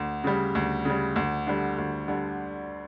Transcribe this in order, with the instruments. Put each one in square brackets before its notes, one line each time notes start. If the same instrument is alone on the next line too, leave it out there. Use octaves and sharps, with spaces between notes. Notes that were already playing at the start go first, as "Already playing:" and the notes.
Already playing: [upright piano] D2
C#3 G3
D2
C#3 G3
D2
D3 G3
D2
D3 G3